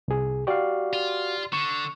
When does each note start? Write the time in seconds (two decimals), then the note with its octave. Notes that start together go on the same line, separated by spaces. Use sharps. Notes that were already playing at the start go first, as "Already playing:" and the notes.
0.08 C2 G#4
0.47 F#4 G4 D5 F5
0.93 F4
1.53 D3 C#6